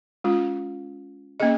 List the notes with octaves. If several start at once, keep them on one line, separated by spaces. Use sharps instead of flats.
G#3 C#4 F4
A#3 C#4 G#4 D#5